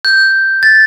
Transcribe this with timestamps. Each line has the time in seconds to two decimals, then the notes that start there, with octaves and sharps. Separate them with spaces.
0.05 G6
0.63 A6